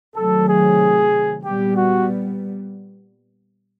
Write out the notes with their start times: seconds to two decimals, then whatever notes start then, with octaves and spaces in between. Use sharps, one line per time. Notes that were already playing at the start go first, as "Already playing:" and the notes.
0.16 C3 D#3 F#3 A3 A4
0.49 G#4
1.45 A#2 G3 B3 G4
1.77 F#4